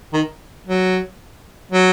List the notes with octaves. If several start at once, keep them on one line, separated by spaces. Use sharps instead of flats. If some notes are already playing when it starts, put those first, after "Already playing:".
D#3
F#3
F#3